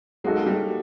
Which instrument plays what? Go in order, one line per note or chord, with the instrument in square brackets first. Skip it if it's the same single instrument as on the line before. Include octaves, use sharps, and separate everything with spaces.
[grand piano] F#3 A#3 D#4 F#4 A4 [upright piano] G#3
[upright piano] G#3
G3